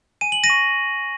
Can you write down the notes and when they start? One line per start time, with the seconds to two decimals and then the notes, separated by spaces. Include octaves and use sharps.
0.21 G#5 D#7
0.32 F#7
0.44 A#6 D#7
0.50 C#6